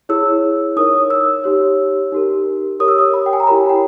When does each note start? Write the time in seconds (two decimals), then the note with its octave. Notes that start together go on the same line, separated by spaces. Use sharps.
0.09 E4 G#4 C#5 E6
0.76 D#4 A#4 C#5 D#6
1.10 E6
1.44 D#4 G4 C#5
2.12 D#4 G4 A#4
2.80 G4 A#4 C#5 D#6
2.88 E6
2.98 D#6
3.14 B5
3.26 G5
3.33 G#5
3.40 A#5
3.47 E4 G4 A#4 C#5 B5
3.69 G5